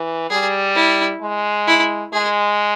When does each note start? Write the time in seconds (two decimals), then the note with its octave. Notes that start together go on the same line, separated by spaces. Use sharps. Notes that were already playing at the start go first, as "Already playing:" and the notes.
Already playing: E3
0.30 G3 G#4
0.75 E4
1.22 G#3
1.67 E4
2.13 G#3 G#4